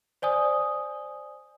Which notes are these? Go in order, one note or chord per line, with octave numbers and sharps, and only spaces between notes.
C5 D5 G#5 D#6